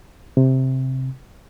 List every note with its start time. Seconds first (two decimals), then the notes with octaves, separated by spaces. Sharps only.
0.37 C3